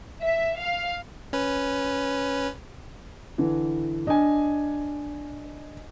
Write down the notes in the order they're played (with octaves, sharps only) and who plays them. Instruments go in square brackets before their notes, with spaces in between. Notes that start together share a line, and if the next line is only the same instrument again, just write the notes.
[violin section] E5
F5
[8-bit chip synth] C#4 B4
[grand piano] D3 E3
[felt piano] D4 [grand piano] D#5 G#5